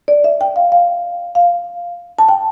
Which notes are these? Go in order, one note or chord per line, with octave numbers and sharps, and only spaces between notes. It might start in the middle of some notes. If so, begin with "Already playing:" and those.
D5
E5
G5
F5
F5
F5
A5
G5